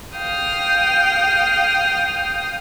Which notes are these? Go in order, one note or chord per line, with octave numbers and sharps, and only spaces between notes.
F5 G5 D#6 F6